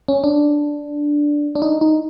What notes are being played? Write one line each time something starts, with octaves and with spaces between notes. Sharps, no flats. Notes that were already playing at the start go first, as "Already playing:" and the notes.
C#4
D4
D4
D#4
D#4